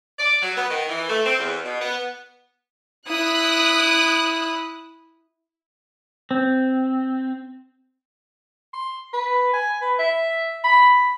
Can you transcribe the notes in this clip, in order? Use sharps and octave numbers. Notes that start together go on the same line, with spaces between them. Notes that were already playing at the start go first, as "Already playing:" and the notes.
D5
F#3
B3
D#3
E3
A3
C4
E2
B2
B3
E4 D#6 F#6
C4
C6
B4
G#5
B4
E5
B5